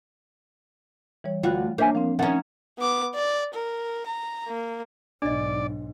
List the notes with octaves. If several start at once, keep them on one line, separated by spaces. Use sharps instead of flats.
E3 G3 C#5
D2 F4 F#4 G5 B5 F#6
A#3 D4 C5 C#5 E5 G#5
F3 C4 F5
D#3 F3 C#4 E5 F#5 A#5 A6
B3 D6
D5
A#4
A#5
A#3
B1 G#2 D4 D5 D#5